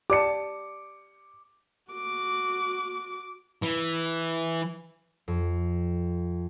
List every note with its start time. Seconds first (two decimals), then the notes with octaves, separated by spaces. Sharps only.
0.10 G4 D5 A5 D6 C#7
1.92 F#4 D6
3.62 E3
5.28 F2